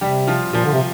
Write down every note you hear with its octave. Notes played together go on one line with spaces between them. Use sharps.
C3 G3 G4
F3 F4
A#2 F3 F4
D3
C3